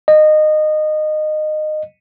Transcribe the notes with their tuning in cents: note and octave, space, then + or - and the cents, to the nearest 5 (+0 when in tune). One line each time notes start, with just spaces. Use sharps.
D#5 -20